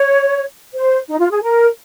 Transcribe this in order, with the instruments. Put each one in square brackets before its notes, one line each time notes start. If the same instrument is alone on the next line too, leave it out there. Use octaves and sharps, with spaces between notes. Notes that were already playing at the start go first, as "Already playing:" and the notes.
Already playing: [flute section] C#5
C5
D#4
F4
G#4
A#4